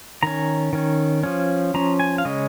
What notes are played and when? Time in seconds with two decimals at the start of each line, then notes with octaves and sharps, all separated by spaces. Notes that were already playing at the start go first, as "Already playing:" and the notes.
0.23 D#3 C#4 A#5
0.73 D#3 C#4
1.23 F3 C#4
1.74 F3 C#4 A#5
2.00 G#5
2.18 F5
2.25 C#3 G#3 C#4 D#5